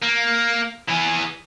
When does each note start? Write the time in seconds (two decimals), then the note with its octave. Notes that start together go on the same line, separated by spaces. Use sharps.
0.02 A#3
0.89 E3 G#4